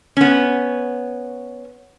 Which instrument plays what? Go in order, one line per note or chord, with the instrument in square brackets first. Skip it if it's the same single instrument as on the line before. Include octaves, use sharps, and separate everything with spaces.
[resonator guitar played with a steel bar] B3 C#4